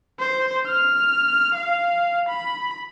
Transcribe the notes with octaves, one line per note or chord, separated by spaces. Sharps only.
C5
F6
F5
B5